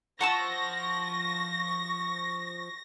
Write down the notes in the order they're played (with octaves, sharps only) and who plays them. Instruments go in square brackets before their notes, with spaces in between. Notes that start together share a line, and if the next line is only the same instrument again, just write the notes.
[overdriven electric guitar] F3 [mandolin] F#5 A5 E6 [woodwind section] C#6 [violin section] A#6